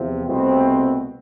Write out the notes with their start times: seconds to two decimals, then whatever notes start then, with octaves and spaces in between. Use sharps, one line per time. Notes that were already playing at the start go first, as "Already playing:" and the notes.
Already playing: E2 C3 F3
0.27 C2 B2 A3 C4